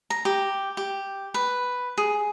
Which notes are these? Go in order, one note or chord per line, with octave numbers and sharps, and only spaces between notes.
A#5
G4
G4
B4
G#4